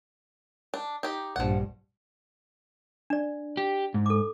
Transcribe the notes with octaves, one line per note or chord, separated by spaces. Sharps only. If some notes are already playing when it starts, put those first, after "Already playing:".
D4
D#4 G4
A#1 G2 F3 F#5
D4 D5
G4
G#2
A4 D6